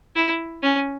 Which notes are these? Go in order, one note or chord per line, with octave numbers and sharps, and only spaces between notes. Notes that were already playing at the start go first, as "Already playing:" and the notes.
E4
C#4